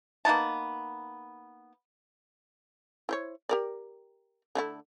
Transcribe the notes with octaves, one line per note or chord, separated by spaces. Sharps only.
A#3 B3 D#4 A5
E4 C5 C#5
G4 A#4 D5
D3 A3 E4